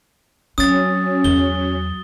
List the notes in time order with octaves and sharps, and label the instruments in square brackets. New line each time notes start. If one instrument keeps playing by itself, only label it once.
[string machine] F#3 [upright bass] C4 [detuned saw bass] C#4 [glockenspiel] D#6 A6
[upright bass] E2 [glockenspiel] G7